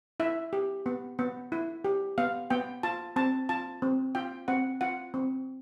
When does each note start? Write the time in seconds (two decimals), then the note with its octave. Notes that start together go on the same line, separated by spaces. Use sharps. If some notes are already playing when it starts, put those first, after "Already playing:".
0.20 E4 E5
0.53 G4
0.86 B3
1.19 B3
1.52 E4
1.84 G4
2.18 B3 F5
2.50 B3 G5
2.83 F4 A5
3.16 C4 A5
3.49 F4 A5
3.82 C4
4.15 F4 G5
4.48 C4 F#5
4.81 F4 F#5
5.14 C4